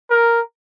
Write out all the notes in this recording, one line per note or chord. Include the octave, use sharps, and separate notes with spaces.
A#4